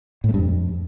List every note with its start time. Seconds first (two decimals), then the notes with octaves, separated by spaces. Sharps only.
0.24 A2
0.29 A3
0.34 G2
0.39 F2